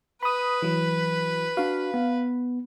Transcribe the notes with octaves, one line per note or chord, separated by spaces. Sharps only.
B4 B5 D#6
E3 F#3
D4 F#4 F5
B3